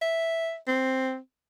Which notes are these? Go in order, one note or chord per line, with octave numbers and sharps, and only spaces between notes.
E5
C4